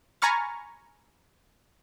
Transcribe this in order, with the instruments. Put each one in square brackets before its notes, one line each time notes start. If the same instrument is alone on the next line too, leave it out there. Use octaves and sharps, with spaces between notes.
[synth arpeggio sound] G#5 A#5 B5 C#6 F6 A6